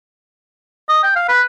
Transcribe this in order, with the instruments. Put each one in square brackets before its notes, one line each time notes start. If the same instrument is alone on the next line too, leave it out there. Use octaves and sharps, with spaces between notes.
[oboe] D#5
G5
F5
B4